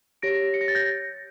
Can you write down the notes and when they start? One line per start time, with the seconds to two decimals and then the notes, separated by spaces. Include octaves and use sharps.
0.22 G4 C#5 A#6 D7
0.54 C#7
0.61 A#6
0.68 A6
0.75 G6 A#6